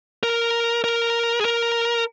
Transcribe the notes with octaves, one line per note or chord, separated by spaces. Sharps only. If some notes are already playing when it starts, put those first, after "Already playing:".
A#4
A#4
G#4
A#4